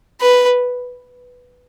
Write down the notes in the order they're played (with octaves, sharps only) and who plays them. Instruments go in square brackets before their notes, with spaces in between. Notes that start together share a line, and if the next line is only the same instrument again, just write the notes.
[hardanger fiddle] B4